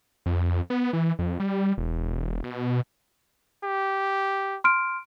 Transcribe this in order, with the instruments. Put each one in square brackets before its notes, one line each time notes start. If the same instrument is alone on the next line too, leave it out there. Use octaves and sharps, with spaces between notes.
[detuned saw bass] F2
B3
E3
F2
G3
E1
B2
[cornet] G4
[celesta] C6 F6 D7